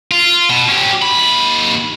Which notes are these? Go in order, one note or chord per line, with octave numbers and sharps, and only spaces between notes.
F4
B2
C#4 G4
D#2 B5